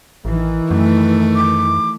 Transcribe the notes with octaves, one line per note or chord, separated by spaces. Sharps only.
A1 D#3 E3
F#2 A3
D6